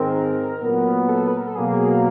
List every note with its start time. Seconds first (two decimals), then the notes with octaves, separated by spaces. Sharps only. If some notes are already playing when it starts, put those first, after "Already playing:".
Already playing: G#2 D#3 G#3 C4 A#4
0.61 A#2 F#3 B3
1.09 A4
1.28 B4
1.37 A#4
1.47 A4
1.55 B2 F#3 A#3 G#4